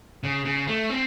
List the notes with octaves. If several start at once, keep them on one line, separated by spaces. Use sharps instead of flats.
C#3
C#3
A3
C4